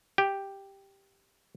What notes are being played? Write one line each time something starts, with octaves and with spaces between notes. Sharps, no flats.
G4